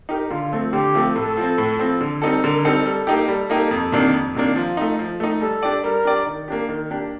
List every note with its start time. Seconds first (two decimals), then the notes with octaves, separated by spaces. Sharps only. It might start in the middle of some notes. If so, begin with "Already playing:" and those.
0.09 D#4 G4 A#4
0.31 D3 F4
0.52 F3 A3 C4
0.73 D3 G4
0.94 F3 A3 C4
1.16 A2 A4
1.37 F3 C4
1.58 A2
1.79 F3 C4
2.01 D3
2.22 G3 C4 D#4 A4
2.43 D3 A#4
2.65 G3 C4 D#4 A4
2.85 G3 A4
3.07 A#3 D#4 G4
3.28 G3 A4
3.50 A#3 D#4 G4
3.71 F2
3.92 C3 D#3 A#3 D4
4.14 F2
4.35 C3 D#3 A#3 D4
4.56 F3 F4
4.77 A3 D#4
4.99 F3
5.20 A3 D#4
5.41 G3 A4
5.63 D4 G4 D5
5.84 G3 A#4
6.05 D4 G4 D5
6.26 D#3
6.48 A#3 D4 G4
6.69 D#3
6.90 A#3 D4 G4